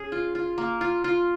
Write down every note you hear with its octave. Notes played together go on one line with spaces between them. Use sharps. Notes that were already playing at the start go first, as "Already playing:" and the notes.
Already playing: C#4 G#4
F4
F4
A#3
F4
F4